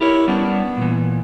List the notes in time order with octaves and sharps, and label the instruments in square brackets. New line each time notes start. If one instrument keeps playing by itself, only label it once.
[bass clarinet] E4 [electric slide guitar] G4 A#4 C#5
[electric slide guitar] G3 C#4 D4 [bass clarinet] B3
[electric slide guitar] A#2 E3